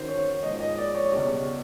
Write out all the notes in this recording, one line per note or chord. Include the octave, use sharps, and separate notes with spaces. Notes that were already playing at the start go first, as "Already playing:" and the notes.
Already playing: F#2 D#3 F#3 C5
C#5
G#2 F3 G#3 D#5
D#5
D5
C#5
C#2 B2 G3 C#5